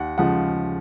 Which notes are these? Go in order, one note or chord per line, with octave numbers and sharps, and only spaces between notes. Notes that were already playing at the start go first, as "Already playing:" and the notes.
Already playing: D#2 F#5
C#3 F3 G#3 F#5